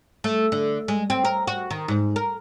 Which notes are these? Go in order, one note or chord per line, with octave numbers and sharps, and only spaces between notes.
A3
D3
G#3
C4
A#4
F#4
D#3
G#2
A#4